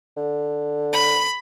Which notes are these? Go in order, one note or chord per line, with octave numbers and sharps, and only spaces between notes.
D3
B5